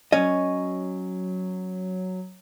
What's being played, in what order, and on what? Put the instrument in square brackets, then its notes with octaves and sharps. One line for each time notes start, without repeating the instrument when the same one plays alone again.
[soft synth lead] F#3 [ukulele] C#4 [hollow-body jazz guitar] D#5